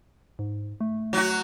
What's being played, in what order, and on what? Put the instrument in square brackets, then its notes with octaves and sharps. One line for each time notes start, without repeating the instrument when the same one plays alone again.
[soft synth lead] G#2
A3
[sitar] F#3 F#4